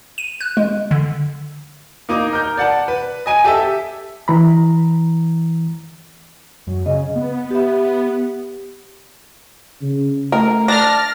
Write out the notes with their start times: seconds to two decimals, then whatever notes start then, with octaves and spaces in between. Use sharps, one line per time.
0.18 D#7
0.41 F#6
0.57 G#3
0.91 D3
2.09 A#3 D#4 D6
2.33 A#4 G6
2.57 D5 F#5 A5
2.88 B4
3.26 D#5 G#5 D#7
3.44 G4 A4 E5
4.28 E3 A#5 B5
6.67 F#2
6.86 C#3 D#5
7.16 B3
7.51 G4 E5
9.81 C#3
10.32 A3 A#4
10.68 D4 F6 A6 A#6